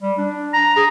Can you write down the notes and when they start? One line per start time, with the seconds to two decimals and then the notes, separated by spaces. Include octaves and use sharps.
0.02 G3
0.18 D4
0.53 A#5
0.77 G#4